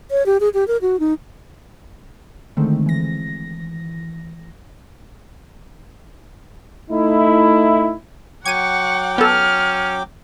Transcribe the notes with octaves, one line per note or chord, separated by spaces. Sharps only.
C#5
G4
G#4
G4
A#4
F#4
D#4
D3 D#3 G#3 A3 C4
E3 A#6
A3 D#4 E4
F#3 F#5 G5 C#6 D6 G#6 D#7
B3 C#4 A4 F6